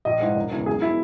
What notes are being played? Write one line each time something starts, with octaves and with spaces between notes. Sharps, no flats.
A#1 D#5
G#2 E3
E1
E2 C#3 E3
B1 G#4
B2 E4